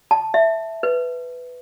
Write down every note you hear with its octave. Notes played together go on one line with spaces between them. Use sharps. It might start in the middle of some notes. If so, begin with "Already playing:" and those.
A5
E5
B4